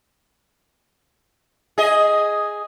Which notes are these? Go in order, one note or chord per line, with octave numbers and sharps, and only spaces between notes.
G#4 D#5